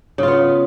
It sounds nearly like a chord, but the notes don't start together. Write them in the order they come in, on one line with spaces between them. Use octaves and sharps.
C#3 F4 B3